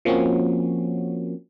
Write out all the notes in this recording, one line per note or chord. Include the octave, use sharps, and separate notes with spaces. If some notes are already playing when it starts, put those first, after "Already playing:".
F3 A#3 C4 C#4 F#4